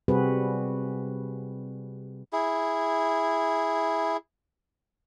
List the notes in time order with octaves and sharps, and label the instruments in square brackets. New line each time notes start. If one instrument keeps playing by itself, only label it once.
[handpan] C3 G3 C4 F#4 G#4 B4
[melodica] E4 G#4